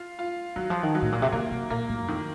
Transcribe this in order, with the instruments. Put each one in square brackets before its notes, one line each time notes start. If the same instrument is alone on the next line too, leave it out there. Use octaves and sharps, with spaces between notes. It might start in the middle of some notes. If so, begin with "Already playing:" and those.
Already playing: [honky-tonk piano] F4
F4
[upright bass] D#3 [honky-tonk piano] F#3
[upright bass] F3
D#3
[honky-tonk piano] F#3
[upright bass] A2
A#2
C3
[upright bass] C#3 [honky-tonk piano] A#3
[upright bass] C3
[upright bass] A#2 [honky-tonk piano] A#3
[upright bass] A2
F#2
[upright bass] F2 [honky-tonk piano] D#3